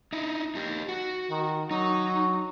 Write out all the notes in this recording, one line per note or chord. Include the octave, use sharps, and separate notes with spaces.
D#4 E4
D#4 G4
F#4
D#3
F#3 D#4